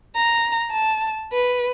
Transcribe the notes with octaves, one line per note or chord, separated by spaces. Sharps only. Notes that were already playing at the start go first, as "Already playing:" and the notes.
A#5
A5
B4